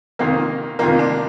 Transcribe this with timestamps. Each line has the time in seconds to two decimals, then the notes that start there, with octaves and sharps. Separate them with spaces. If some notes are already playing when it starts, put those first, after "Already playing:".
0.19 F2 C3 D#3 A#3
0.79 F2 C3 D#3 A#3
0.99 D4